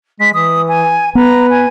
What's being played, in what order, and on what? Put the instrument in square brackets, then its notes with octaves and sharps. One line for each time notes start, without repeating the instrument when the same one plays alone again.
[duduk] G#3 [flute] B6
[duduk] E3 [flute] D#6
[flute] G#5
[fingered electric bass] B3 [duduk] B4 [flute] A#5
[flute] G#5